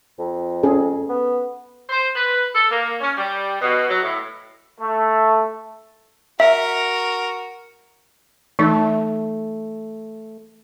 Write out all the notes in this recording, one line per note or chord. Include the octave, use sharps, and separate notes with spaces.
F2
C#4 G#4 A4
B3
C5
B4
A4
A#3
C#4
G3
B2
F#3
A2
A3
F#4 A#4 E5
E3 A3 D#4